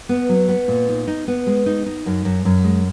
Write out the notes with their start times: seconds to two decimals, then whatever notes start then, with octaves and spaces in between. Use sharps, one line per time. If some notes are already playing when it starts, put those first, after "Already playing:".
0.09 B3
0.29 F#3
0.49 B3
0.68 A#2
0.89 D#4
1.07 D#4
1.28 B3
1.47 G#3
1.66 D#4
1.86 D#4
2.06 F#2
2.25 F#2
2.45 F#2
2.64 G#3